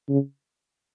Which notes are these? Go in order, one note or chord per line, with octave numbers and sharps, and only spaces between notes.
C#3